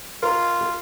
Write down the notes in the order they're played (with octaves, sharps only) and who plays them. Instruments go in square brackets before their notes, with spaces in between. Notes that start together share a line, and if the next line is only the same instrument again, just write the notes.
[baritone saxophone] F4 [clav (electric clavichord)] A#4